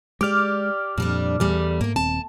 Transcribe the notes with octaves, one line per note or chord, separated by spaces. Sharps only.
G#3 G4 D5 D6 F6
F2 A#2 G3 D4
E2 G3 A3
G#2 A#3 A#4
D#1 D#2 C4 A5